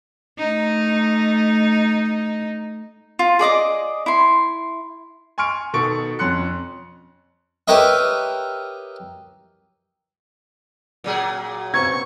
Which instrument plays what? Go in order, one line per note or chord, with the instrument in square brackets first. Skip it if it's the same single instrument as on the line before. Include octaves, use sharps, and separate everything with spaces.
[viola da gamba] A3 D#4
[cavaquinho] F4
G#4 D5 D#5 D6
E4 C6
[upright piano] G#5 C6 C#6 F6 D7
B2 D#3 A4 C#6 D7
F2 C#4 C6 F#6 C#7
[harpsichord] G4 A#4 B4 C#5 D#5 E5
[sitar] A#2 F#3 G#4
[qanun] B3 C4 [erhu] C#6 [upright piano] G#6